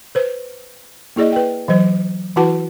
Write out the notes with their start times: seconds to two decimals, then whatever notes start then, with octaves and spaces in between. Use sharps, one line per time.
0.15 B4 C5
1.16 A#3 E4 G#4 D5 D#5
1.32 B4 G5
1.68 E3 F#3 C5
2.36 E3 E4 F#4 B4 F#5 A5